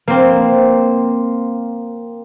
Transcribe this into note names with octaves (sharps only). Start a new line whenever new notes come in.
A#3 C4